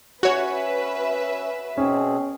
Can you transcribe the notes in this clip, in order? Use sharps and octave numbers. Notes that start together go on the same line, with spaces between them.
C#4 F#4 B4 C#5 E5
B2 C4 C#4 G#4